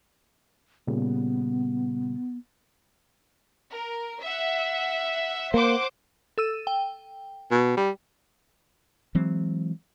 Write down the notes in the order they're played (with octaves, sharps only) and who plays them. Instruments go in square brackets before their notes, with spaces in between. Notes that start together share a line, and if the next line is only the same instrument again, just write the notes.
[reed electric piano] A#2 C#3 G3 [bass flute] B3
[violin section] A#4
E5 F#5
[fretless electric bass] A#3 [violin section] C5 F#5 D6
[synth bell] A4 E6 D#7
G5
[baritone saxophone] B2
G3
[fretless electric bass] E3 F#3 G#3 C4